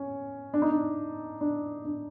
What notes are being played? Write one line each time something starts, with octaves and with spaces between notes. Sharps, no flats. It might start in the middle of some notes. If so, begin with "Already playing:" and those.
Already playing: C#4
D4
D#4
D4
D4
D4